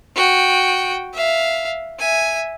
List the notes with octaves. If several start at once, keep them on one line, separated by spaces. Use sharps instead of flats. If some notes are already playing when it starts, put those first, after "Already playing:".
F#4 G5
E5 F5
E5 G#5